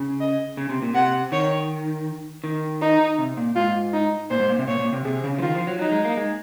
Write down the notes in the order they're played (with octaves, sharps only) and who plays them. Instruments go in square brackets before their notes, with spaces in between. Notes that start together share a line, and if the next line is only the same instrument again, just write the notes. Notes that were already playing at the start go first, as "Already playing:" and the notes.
Already playing: [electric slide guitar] C#3
[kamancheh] D#5
[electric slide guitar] C#3
C3
A#2
[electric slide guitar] C3 [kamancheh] F#5
[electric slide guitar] D#3 [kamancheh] C#5
[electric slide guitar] D#3
[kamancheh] D#4
[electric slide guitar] C3
A#2
[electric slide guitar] G#2 [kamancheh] F4
[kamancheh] D#4
[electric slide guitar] A#2 [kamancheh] C5
[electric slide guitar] G#2
A#2
C3
[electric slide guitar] A#2 [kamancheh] C#5
[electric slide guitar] A#2
C3
[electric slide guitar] C3 [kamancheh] G#4
[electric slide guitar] C#3
F3
[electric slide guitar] D#3 [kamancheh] F4
[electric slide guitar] F3
F#3
[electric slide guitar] F#3 [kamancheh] D#4
[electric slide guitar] G#3
A#3
G#3